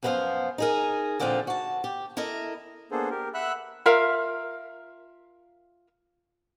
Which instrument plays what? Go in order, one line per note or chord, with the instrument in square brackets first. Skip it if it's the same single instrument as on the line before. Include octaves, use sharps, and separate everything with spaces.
[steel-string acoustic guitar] F#2 F3 B3 A#4 C5 F5
D#4 G#4 A#4
A#2 D3 F3 B3 C4 F4
F#4 A5
G4
E4 A4 A#4 D#5
[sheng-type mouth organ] A#3 B3 D4 G#4 A4 C5
G4 A#4
E5 F#5 B5 E6 F#6
[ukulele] F4 A#4 E5 F5